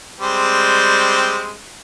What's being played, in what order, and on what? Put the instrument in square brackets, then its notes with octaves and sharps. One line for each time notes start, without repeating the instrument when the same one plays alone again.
[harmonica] G3 G#3 C4